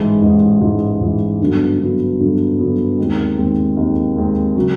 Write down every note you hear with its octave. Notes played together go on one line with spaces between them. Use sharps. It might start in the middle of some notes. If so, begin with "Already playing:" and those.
Already playing: A1 G#2 E3 G#3
A1 G#2 E3 G#3
A1 G#2 E3 G#3
A1 G#2 E3 G#3
G2 D3 F#3 B3
G2 D3 F#3 B3
G2 D3 F#3 B3
G2 D3 F#3 B3
D#2 D#3 G#3 C4
D#2 D#3 G#3 C4
D#2 D#3 G#3 C4
D#2 D#3 G#3 C4
C#3 F#3